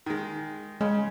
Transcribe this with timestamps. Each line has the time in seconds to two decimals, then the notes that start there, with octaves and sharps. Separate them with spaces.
0.06 D#3 G#3
0.81 C#3 G#3